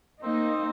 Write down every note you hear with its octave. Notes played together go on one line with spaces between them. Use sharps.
A#3 C4 D#4